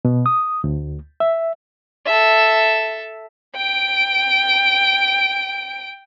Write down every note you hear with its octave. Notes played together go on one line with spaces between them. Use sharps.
B2
D#6
D2
E5
A4 E5
G5 D7